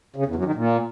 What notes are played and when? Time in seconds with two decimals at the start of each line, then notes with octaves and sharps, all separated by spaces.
0.16 C#3
0.26 E2
0.35 F#2
0.45 D#3
0.55 A#2